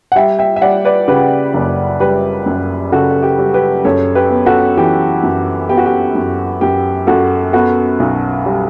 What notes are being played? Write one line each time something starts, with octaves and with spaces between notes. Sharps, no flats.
F#5
G3 E5 G5
E5 G5
E5
G3 D5 F#5
B4 D5
C#3 G4 B4
F#1
G3 G4 B4
F#2
C#3 F#4 A4
A4
G4
G3
G4 B4
F#2 A4 C#5
G4 B4
B3
F#4 A4
E3 G4
F#2
B3 G4
F#4
G4
F#2
F#2 G4
F#2 F#4 A4
B3 F#4 A4
B1
G3